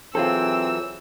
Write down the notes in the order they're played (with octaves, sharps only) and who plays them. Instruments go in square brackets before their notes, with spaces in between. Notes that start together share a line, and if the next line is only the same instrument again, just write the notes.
[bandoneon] E3 F#3 [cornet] C4 [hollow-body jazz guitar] F4 G#4 A4 [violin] E6